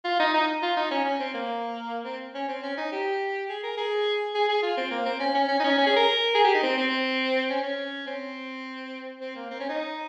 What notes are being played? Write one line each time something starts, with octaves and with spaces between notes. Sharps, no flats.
F4
D#4
D#4
F4
D#4
C#4
C#4
C4
A#3
C4
C#4
C4
C#4
D#4
G4
G#4
A#4
G#4
G#4
G#4
F4
C4
A#3
C4
C#4
C#4
C#4
D#4
C#4
C#4
G#4
A#4
G#4
G4
D#4
C4
C4
C#4
C#4
C4
C4
A#3
C4
C#4
D#4